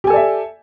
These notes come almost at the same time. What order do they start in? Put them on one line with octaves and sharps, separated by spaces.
G4 G#5 A4 D5 E5